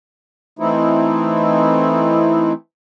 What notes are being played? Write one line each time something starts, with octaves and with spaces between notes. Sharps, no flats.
E3 A3 C4 D#4 E4